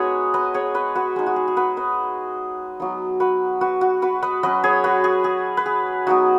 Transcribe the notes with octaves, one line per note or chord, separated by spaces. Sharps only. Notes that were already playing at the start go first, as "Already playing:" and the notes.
Already playing: G#3 B3 D#4 F#4 G#4 B4 C#5
B4 D#5
G#4 C#5
B4 D#5
F#4 B4
G#3 D#4
F#4
G#4
G#4
F#4 B4
B4 D#5
F#3 B3 D#4
F#4 B4
F#4 B4
F#4
F#4 B4
B4 D#5
F#3 C#4 B4 D#5
G#4 C#5
F#4 B4
G#4
G#4
B4
G#4
F#3 B3 D#4 F#4